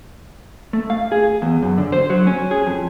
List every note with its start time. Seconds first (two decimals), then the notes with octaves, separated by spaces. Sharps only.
0.73 A3
0.90 F5
1.12 G#4
1.42 E2
1.63 F#2
1.78 D3
1.92 C5
2.10 F#3
2.27 C#4
2.51 G#4
2.66 F2